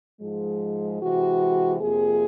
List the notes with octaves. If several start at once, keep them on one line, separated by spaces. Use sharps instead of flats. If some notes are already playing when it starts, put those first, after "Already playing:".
G#2 F3 G#3
C3 E3 G#3 F#4
F2 C3 F3 A#3 G#4